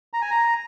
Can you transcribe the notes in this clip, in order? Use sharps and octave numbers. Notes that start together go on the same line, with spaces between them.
A#5
G#5
A#5